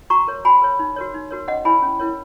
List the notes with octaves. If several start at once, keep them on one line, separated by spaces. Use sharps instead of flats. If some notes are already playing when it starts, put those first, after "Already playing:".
F#4 A#5 C#6
A#4 C#5
F#4 G#5 B5
A#4 C#5
D#4
F#4 A#4 C#5
D#4
F#4 A#4 C#5
C#4 D#5 F#5
E4 A#4 C#5 G#5 B5
C#4
E4 A#4 C#5